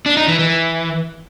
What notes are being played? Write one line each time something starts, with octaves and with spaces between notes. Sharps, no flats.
D4
D#4
E3
E3